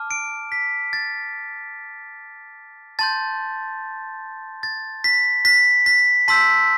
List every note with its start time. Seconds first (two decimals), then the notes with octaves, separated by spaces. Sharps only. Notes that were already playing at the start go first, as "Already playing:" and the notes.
Already playing: A5 D6 F6
0.11 D7
0.52 B6
0.93 A6
2.99 A5 C6 G6 A6
4.63 A6
5.04 B6
5.45 B6
5.86 B6
6.28 A5 C6 E6 G6 B6